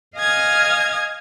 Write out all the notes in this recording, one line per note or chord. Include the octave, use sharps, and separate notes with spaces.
D#5 F5 G#5 D#6 F6 G#6